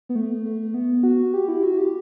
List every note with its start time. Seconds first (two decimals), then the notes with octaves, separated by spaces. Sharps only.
0.09 B3
0.15 A3
0.45 A3
0.74 B3
1.03 F#4
1.34 G4
1.48 E4
1.63 F#4
1.78 G4